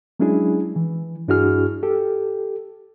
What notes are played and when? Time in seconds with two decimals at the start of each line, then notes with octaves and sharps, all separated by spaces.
0.20 F#3 G#3 C#4 D4 E4 G#4
0.76 E3
1.28 G2 D4 E4 F#4 G#4 F6
1.83 G4 A4